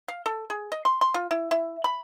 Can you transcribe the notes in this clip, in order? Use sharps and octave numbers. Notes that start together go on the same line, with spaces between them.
F5
A4
G#4
D#5
C6
C6
F4
E4
E4
B5